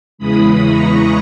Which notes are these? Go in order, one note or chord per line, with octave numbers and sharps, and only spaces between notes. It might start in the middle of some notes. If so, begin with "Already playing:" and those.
E2 C#3 E3 G#3 B5 D#6
A#5 C#6